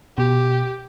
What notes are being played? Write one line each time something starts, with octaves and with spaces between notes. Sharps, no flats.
B2 G4